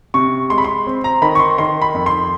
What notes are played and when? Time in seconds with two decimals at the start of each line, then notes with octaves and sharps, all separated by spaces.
0.14 C3 C#6
0.50 G#3 C6
0.58 B5
0.64 C6
0.87 C4
1.04 A#5
1.22 D#3 B5
1.35 C#6
1.40 C6
1.58 D#3 C6
1.82 B5
1.94 F2
2.06 C6